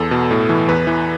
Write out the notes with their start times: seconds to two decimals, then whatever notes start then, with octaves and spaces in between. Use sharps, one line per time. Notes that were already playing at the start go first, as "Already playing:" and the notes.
Already playing: E2 A4
0.11 B2
0.31 A2
0.49 E3
0.68 E2 B4
0.87 E3